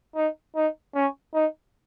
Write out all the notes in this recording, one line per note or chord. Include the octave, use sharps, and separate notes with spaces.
D#4
D#4
C#4
D#4